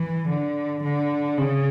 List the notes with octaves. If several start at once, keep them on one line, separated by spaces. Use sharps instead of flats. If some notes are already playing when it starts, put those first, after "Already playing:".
Already playing: E3
D3
D3
C#3